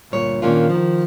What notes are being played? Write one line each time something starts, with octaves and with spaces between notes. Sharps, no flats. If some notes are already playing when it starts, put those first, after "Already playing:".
D2 G2 A#2 C#5
A#2 D#3 A#3 C#4 D4 F4
D#3 F3